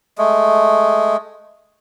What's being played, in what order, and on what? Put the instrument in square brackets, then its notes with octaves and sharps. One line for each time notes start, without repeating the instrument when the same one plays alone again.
[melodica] G#3 A3